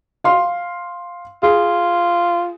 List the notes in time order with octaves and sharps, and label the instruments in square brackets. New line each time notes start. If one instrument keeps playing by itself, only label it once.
[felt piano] F5 C6
[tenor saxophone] F4 [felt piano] G#4